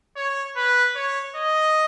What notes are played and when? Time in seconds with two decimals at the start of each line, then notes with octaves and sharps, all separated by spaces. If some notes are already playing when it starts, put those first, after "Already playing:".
0.16 C#5
0.56 B4
0.96 C#5
1.36 D#5